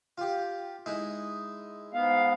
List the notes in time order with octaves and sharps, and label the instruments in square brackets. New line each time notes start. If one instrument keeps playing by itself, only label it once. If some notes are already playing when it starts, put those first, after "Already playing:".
[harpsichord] F4 G4
G#3 D#4 E4
[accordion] G#2 B3 F5